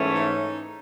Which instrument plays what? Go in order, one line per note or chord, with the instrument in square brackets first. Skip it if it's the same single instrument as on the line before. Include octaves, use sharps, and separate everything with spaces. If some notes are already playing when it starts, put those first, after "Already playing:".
Already playing: [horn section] G#2 E3 A3 C#4
D#4